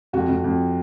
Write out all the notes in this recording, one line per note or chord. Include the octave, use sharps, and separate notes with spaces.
F2 F#4
F2
F2